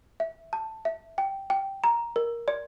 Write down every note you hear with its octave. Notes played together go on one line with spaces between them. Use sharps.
E5
A5
E5
G5
G5
A#5
A#4
D5